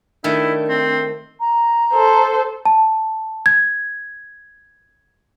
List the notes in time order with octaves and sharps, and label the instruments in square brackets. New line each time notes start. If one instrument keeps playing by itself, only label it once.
[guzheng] D#3 A3 [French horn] D4 [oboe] E4
[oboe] C4
[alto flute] A#5
[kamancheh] A4 C5
[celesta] A5
G#6